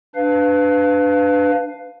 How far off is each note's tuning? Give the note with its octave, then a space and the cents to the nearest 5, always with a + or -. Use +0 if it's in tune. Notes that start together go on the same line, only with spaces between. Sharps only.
D4 +0 B4 +20 F5 +0